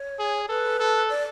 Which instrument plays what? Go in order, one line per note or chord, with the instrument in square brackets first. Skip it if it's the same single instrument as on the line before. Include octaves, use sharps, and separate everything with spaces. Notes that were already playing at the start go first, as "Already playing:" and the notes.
Already playing: [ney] C#5
[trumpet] G#4
[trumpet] A4 [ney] B4
[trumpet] A4
[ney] D5